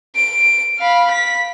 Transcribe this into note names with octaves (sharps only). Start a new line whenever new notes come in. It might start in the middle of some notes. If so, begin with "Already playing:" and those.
D7
F5 B5
B6